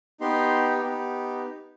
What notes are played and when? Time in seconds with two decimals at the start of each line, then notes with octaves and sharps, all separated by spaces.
0.20 B3 D#4 G4 C6
0.82 B3 D#4 G4